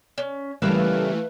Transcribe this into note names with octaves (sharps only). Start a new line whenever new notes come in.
C#4
C#3 E3 G3 A3 A#3 B4 E5 F5